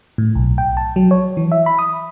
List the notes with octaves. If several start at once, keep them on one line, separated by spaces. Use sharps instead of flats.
A2
B1
G5
A5
F#3
C#5
E3
E5
B5
D#6